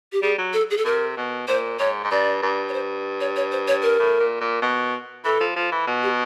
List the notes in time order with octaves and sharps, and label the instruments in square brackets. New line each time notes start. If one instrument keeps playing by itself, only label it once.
[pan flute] G4
[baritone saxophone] G3 [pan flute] G#4
[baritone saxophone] F#3
[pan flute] A4
G#4
A4
[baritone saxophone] C3 [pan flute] A#4
[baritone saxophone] B2
[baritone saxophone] A#2 [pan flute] C5
[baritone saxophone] G#2 [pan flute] C#5
[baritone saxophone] G#2
[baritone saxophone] G2 [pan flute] D5
[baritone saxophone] G2
[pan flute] C#5
C5
C#5
C#5
C5
C#5
A#4
[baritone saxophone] A2
A#2
A#2
B2
[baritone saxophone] E3 [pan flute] A4
[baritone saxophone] F3
F3
E3
B2
[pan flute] G4